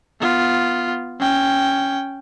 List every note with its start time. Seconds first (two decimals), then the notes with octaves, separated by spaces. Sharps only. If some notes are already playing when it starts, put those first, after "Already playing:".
0.20 B3 F4
1.19 C#4 G5